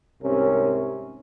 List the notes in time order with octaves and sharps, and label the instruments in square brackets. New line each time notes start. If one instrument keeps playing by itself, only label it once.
[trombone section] C2 G#2 C3 C#4 A#4